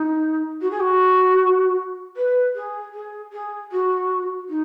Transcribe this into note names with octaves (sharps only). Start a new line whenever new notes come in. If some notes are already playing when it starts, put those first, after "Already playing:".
Already playing: D#4
F#4
G#4
F#4
B4
G#4
G#4
G#4
F#4
D#4